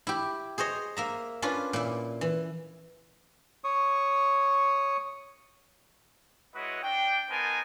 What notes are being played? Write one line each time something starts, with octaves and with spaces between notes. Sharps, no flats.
E4 G4
G#4 C5 C#5 D#5
A#3 E5 A#5
C#4 D4 F4 B4
A#2 E4
E3
C#5 C#6 D#6
G#3 E4 F#4 B4 C#5 D#5
D4 G5
B3 D#4 A#4 C5 G#5 A5